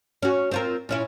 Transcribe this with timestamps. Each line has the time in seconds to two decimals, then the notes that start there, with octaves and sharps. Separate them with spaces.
0.22 C#4 F#4
0.51 C4 F4 A#4
0.89 A#2 C#4 E4